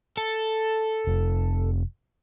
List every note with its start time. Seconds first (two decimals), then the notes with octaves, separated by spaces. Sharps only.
0.18 A4
1.07 F1